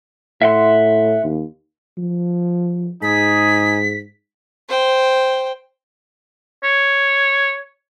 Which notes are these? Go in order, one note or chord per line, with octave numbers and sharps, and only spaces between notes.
A2 E5 F#5 C6
D#2
F3
G#2 D#4 G#4 B6
C5 G5
C#5